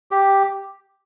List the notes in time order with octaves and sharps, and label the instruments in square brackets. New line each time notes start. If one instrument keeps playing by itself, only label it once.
[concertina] G4